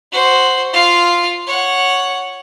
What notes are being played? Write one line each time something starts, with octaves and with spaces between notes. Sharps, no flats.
F#4 C5
F4 F5
C#5 F#5